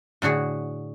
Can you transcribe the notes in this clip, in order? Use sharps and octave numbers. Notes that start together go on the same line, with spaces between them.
A2 D3 F#4 G#4